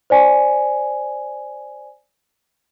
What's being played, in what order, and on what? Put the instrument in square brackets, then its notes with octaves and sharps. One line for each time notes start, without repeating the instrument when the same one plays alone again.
[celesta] C5 D5 G#5